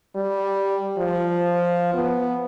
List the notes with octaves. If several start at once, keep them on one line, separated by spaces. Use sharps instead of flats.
G3
F3
B3